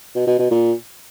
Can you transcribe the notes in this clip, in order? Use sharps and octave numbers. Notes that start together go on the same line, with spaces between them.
B2
B2
B2
A#2